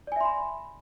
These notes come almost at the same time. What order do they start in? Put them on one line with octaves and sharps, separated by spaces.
D5 G#5 E5 C6 B5